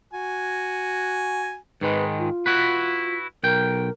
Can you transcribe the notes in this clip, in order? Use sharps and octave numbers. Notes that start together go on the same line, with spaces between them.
F#4 G#5
G#2 D#3 G#3 B4
F4
E4 F#4 B4
B1 A#4 G5